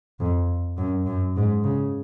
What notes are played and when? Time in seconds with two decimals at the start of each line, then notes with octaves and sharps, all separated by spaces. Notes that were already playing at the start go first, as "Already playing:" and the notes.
0.20 F2
0.77 F#2
1.06 F#2
1.36 G#2
1.64 C#3